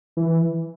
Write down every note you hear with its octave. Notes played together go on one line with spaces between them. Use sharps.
E3